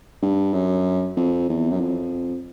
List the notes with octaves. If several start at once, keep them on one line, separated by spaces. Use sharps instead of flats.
G2
F#2
F2
E2
F#2
F2